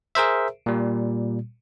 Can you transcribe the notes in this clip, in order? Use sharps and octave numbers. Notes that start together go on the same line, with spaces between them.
G#4 A#4 C5 E5
A#2 G3